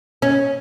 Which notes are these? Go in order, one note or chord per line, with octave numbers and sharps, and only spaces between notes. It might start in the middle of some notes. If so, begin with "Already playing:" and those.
C#4